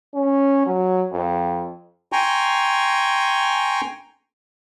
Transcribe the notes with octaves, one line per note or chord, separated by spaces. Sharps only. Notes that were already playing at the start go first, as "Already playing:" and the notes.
C#4
F#3
F2
G5 G#5 A#5 C6 C#6